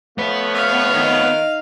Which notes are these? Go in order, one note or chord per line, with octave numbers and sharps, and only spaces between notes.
F3 A3 B3 B4 C#5
F5
D#3